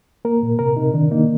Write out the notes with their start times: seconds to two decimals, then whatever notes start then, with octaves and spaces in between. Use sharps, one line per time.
0.25 A#3 A#4
0.43 A#2
0.59 C3 A#4
0.77 C3 D#4
0.94 D#3 D4
1.11 A#3 D#4